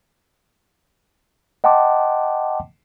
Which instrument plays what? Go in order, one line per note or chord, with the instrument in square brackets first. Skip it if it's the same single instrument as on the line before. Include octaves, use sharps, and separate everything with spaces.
[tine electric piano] D#5 F#5 G5 A5 C6 D6